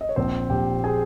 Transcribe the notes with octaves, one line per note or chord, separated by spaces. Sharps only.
D#5
C#5
A#1 C4 C5
A#1 G4 G5
G#4 G#5